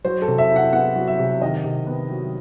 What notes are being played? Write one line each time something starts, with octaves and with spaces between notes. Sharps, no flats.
F#3 C5
A4
C3
E5
E4
F#5
B3 F#5
F#3
E5
C3
D#3 D#5
C3
B3
F#3